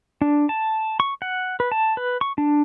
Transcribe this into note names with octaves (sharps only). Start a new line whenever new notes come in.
D4
A5
C#6
F#5
B4
A5
B4
C#6
D4